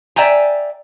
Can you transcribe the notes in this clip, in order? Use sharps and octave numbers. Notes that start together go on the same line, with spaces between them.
D5 E5 G5 G#5 A#5